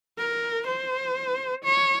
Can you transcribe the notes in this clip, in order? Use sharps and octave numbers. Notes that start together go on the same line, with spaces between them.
A#4
C5
C#5